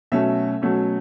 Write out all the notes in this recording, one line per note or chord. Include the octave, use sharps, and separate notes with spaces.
B2 F#3 A3 C#4 E5
B2 F#3 A3 C#4